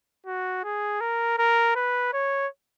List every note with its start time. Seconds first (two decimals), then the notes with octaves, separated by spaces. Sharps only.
0.26 F#4
0.64 G#4
1.01 A#4
1.38 A#4
1.76 B4
2.14 C#5